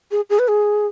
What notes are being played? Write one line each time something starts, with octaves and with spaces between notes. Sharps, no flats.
G#4
G#4
B4
G#4